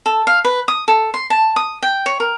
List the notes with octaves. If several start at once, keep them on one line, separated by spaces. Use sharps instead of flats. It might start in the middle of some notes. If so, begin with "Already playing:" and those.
A4
F5
B4
D#6
A4
C6
A5
D#6
G5
C#5
A#4